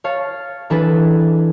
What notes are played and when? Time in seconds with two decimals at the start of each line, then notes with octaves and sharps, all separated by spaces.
0.04 C#5 F5 A5
0.70 E3 D4 G#4 A4 B4